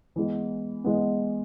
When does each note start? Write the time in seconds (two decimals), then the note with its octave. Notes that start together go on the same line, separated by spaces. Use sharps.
0.16 E3 G#3 B3
0.84 E3 G#3 B3